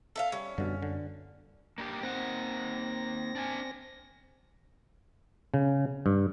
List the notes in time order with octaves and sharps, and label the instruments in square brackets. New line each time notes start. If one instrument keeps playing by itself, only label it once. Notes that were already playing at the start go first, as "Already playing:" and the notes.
[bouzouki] A4 E5 F5
[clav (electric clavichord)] G3 [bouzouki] C#4
[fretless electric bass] F#2 G3 [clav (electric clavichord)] B2 D3
[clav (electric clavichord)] D3
[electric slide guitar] A#3 D4 G4
[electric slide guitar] A#3 D#4 F#5 [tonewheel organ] C4 A#6
[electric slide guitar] D4 G#5
[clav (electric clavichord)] C#3
G2